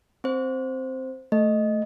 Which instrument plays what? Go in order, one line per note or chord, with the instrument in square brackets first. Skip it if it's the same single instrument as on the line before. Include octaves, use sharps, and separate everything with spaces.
[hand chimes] C4 C5
[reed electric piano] A3 [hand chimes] D#5